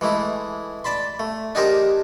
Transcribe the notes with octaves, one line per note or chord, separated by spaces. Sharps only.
E3 G#3 A3 E4
D5 A5 B5 C6
A3
D4 D#4 G4 G#4 A#4 C5